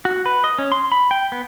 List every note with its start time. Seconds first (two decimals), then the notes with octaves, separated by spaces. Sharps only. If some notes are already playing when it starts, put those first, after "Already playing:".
0.05 F#4
0.26 B4
0.44 D#5
0.59 C#4
0.72 C6
0.92 B5
1.11 G5
1.32 B3